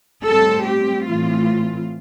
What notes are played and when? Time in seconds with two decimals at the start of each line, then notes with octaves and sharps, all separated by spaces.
0.25 A2 G3 C4 A4
0.66 G4
1.07 A2 E3 A3 C4 F4